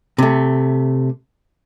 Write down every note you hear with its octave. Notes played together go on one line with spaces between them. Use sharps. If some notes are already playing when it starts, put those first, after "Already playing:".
C3 A3